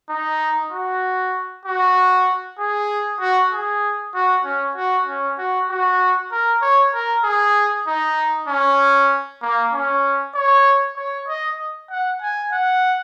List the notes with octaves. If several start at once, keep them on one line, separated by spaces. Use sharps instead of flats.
D#4
F#4
F#4
G#4
F#4
G#4
F#4
C#4
F#4
C#4
F#4
F#4
A#4
C#5
A#4
G#4
D#4
C#4
A#3
C#4
C#5
C#5
D#5
F#5
G#5
F#5